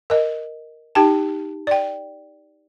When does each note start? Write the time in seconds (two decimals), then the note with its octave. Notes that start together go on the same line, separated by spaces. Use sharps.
0.10 A#4 D#5
0.95 D#4 G4 G5 A5
1.67 D5 G5